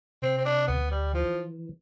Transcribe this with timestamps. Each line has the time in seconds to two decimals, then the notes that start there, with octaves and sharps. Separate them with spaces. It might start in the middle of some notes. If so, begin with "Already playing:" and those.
0.22 C3 C4
0.38 C4
0.45 D4
0.68 D2 B3
0.91 G3
1.13 E3 F3